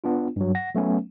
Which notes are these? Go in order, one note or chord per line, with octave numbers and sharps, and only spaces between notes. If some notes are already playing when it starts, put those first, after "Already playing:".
B3 D4 F4
G2 F#3
F#5 A#6
F#3 A3 B3 C#4